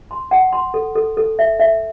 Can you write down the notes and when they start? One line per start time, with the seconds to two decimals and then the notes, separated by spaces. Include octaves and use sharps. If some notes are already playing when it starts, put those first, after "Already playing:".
0.11 C6
0.31 F#5
0.53 C6
0.74 A4
0.96 A4
1.17 A4
1.39 E5
1.59 E5